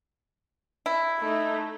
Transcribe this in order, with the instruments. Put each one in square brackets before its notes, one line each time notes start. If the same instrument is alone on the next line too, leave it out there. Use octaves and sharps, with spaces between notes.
[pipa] E4
[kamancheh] A3 D#4